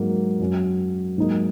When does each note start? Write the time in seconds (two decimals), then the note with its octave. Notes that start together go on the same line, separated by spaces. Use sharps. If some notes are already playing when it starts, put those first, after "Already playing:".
Already playing: G#2 F#3 A#3
0.40 F#2 F#3 C#4
1.18 G#2 F#3 A#3 D#4